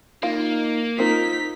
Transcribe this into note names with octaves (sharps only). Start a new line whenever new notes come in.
A#3 D#4 F4
C4 D#4 F4 A#4 B6